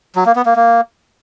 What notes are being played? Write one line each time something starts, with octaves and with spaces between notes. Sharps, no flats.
F#3
A#3
B3
A#3
A#3